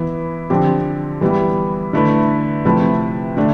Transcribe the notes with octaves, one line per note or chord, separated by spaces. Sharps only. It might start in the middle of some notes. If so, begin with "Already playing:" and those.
Already playing: E3 B3 E4
D3 F3 C4 G4
E3 G3 B3 E4
D3 A3 E4 B4
C3 F3 A3 E4 B4
D3 A3 D4